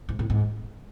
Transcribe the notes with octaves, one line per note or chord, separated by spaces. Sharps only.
G#2
A2
G#2